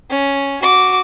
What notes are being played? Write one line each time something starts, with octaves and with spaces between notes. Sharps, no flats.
C#4
F#4 D6